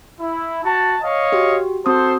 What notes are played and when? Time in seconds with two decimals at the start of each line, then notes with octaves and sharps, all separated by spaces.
0.19 E4
0.64 F#4 A5
1.02 C#5 D#5 F5
1.32 F#4 G4
1.86 C4 F#4 A4 C5 D#6